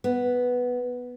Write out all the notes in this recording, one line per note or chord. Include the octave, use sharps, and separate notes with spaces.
B3